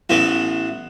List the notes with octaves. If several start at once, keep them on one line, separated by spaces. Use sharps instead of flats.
A1 A2 E3 B3